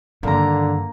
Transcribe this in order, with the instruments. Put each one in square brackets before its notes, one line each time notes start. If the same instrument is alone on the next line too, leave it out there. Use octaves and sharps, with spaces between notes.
[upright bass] G2 D#3 [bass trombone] D3 [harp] A#3 A#5